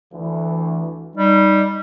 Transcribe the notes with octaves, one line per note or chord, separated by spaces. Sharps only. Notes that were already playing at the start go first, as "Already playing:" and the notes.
D2 E3
G3 D#4